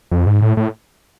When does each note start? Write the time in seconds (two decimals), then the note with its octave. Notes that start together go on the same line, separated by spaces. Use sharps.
0.11 F2
0.26 G#2
0.42 A2
0.57 A2